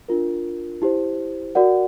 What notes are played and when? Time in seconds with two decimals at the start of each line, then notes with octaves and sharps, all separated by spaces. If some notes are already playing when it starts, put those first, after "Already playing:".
0.09 D4 F4 A#4
0.82 E4 G4 C5
1.55 F#4 A#4 D5 F#5